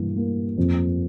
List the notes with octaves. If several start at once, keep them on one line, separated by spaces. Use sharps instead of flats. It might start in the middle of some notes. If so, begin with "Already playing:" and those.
Already playing: G2 E3 A#3
A#3
F2